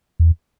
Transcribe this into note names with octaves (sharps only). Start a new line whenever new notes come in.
E2